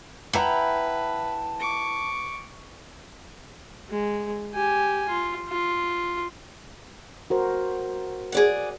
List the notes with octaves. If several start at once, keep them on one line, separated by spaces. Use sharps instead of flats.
E4 B4 F#5 G5 A5 A#5
C#6 D6
G#3
G4 G#5
F4
F4
F#4 A#4 C5
G#4 D5 F#5